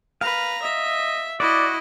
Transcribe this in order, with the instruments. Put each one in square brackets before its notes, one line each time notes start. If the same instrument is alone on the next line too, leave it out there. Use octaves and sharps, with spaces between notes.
[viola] B4 A#5 [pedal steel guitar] F5
[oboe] D#5 [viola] E5
[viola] E4 D#5 [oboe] F#4 [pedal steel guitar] D5